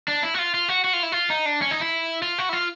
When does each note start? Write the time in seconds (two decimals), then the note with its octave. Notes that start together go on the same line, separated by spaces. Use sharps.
0.08 D4
0.23 E4
0.34 F#4
0.39 F4
0.54 F4
0.69 F#4
0.84 F#4
0.93 F4
1.03 E4
1.12 F4
1.30 D#4
1.46 D4
1.62 C#4
1.71 D#4
1.81 E4
2.22 F4
2.38 F#4
2.49 E4
2.53 F4